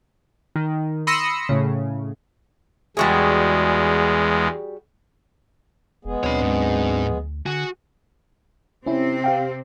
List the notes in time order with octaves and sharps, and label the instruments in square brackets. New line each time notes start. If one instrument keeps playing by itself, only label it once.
[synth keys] D#3
B5 C6 D#6 E6 A#6 C#7
A2 C#3
[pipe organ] E2 G#3 [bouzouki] G3 F#4 G#4
[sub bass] F1 [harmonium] G#3 B3 G#4
[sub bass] D2 [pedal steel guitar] F#3 C4 D4 [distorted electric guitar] C#5 B5
[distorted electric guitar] G#2
[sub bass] D3 [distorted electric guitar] F#4 [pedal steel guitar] G#4 G#5
[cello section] C3 C4 [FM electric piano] C#4 E4
[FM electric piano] G4 F5 G5